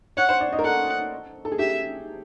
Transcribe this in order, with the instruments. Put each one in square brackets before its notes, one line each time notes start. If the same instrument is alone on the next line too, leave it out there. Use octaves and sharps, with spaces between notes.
[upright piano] C#5 [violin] F#5
[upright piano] C5
D5
D#5
A#4
[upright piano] A4 [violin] F#5
[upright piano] A4
G#4
[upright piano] G4 [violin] E5